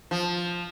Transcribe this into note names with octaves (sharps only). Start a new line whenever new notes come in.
F3